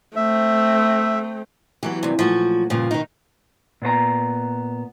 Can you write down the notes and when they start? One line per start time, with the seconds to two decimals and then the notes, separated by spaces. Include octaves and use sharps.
0.16 A3 C4 E5
1.83 E3 F#3 B3 G4
2.03 G2 C3
2.19 A#2 F3 F#3 A3 F#4
2.70 G2 A#2 C#3 F3
2.91 B2 D#3 D#4
3.82 A#2 B3 C5 A#5